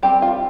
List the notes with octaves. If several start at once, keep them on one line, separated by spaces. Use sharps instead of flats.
G3 C4 G4
F4